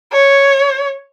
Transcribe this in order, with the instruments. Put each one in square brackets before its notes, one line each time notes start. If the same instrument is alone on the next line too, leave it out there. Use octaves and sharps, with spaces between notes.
[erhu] C#5